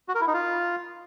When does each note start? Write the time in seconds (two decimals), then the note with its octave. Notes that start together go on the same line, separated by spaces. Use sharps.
0.09 F#4
0.15 A#4
0.21 E4
0.27 D#4
0.34 F4